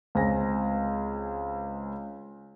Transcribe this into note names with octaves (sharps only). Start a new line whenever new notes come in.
C#2 C4 G#5 A#6